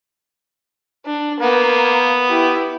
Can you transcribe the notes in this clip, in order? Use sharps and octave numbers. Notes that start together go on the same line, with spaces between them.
D4
A#3 B3
E4 G4